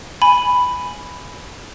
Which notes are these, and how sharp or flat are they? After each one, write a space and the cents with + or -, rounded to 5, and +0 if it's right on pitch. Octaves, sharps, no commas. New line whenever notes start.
G#5 +0 B5 +5